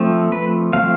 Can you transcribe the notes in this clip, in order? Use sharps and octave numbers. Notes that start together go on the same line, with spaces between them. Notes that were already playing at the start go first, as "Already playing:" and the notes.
Already playing: F3 A3 C4
B4
F3 A3 C4 F5